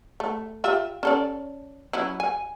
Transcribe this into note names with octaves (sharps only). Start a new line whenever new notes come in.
A3
F4 G4 E5
C#4 A4 D5
F#3 C#4 E4
G#5